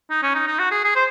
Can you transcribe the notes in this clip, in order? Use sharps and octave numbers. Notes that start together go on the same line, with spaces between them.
D#4
C#4
D#4
D#4
F#4
G#4
G#4
C5